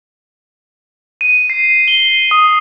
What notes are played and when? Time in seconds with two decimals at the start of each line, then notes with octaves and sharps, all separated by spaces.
1.21 D#7
1.50 C7
1.88 G7
2.31 D#6